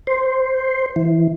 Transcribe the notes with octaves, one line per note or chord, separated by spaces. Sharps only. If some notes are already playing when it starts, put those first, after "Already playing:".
C5
E3